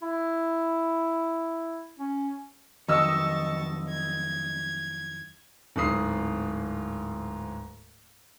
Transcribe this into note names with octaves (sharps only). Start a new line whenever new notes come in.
E4
C#4
F2 D#3 F#3 D#5 A5 C#6 D#6 E6
G#6
D1 G#2 D#6 C7